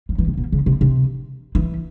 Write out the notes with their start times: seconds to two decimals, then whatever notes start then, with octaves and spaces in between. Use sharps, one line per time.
0.09 F3
0.18 E3
0.27 C3
0.37 B2
0.52 C#3
0.66 C3
0.81 C3
1.55 E3